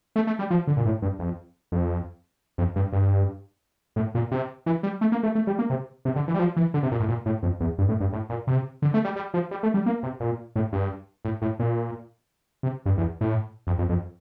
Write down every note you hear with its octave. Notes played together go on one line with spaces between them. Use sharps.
A3
A3
G3
F3
D3
A#2
A2
G2
F2
F2
F2
G2
G2
A2
A#2
C3
E3
G3
A3
A#3
A3
A3
G3
A#3
C3
C3
D3
E3
G3
F3
E3
D3
C3
A#2
A2
A#2
A2
F2
E2
G2
A2
G2
A2
A#2
C3
D3
A3
G3
G3
F3
G3
A3
G3
A#3
C3
A#2
A2
G2
A2
A2
A#2
C3
G2
E2
A2
F2
F2
F2